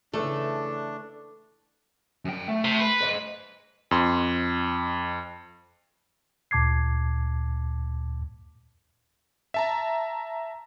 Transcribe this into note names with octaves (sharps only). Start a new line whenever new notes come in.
C#3 E3 A3 D4 A4
F#2 G5
A3
C3
B4
C5 D#5
F2 C6
D2 A#2 A5 D6 G#6 C7
E5 A5 A#5